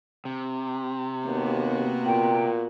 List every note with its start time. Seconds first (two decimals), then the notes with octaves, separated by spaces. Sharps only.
0.25 C3
1.26 D#2 A#3 B3 F#4
2.05 A#2 G5